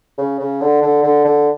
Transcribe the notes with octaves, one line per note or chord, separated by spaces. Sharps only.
C#3
C#3
D3
D3
D3
D3